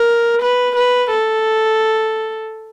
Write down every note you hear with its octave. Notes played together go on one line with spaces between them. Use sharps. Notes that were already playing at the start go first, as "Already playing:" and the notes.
Already playing: A#4
B4
B4
A4